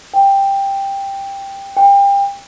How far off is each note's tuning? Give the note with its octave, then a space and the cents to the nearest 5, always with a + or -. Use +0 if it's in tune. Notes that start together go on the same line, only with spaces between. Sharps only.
G5 +10
G5 +30